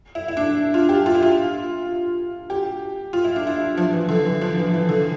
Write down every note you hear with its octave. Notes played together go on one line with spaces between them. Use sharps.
E4
E4
D4
F4
G4
F4
E4
F4
G4
F4
E4
D4
E4
F3
E3
D3
E3
F3
E3
E3
D3